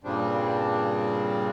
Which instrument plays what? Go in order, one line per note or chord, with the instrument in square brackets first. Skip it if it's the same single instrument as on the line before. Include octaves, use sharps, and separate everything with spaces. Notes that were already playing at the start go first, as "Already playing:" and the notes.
[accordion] G2 A#2 C#3 G3 C4 D4